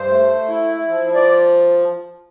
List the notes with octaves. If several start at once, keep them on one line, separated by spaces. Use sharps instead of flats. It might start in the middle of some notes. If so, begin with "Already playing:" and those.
Already playing: G2 C5
A3
E4
F3
D5